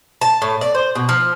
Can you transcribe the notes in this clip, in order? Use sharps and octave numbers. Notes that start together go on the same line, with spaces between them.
A5
A2
D5
C5
B2
F3